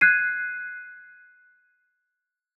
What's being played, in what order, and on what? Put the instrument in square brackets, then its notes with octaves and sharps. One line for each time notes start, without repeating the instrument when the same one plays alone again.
[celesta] F#6 G#6 C7 D#7